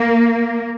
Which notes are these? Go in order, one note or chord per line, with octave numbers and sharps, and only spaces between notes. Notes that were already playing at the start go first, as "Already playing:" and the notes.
Already playing: A#3